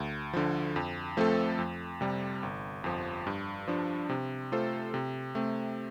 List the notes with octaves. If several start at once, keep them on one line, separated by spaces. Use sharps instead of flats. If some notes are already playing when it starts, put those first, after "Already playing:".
Already playing: D2
D3 F3
F2
F3 A3 C4 A4
F2
C3 G3
G1
F2 F3
G2
F3 D4
C3
A3 F4 A4 C5
C3
A3 C4